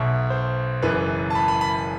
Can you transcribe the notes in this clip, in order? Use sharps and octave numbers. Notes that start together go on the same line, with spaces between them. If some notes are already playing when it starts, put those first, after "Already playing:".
Already playing: B1 B2 E5
C5
F#1 F#2 E3 B4
A5
B5
B5
B5